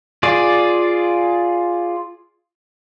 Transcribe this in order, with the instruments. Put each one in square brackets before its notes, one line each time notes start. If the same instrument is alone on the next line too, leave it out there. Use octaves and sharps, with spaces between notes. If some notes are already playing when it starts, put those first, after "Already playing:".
[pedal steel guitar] F4 G#4 D5